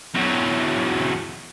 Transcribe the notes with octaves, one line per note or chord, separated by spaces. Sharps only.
E2 F#3